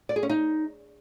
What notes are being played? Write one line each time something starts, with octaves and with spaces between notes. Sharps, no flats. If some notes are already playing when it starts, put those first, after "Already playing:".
D5
G#4
C#4
D#4